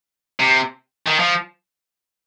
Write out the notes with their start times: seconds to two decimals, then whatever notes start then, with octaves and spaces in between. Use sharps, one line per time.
0.40 C3
1.06 D#3
1.19 F3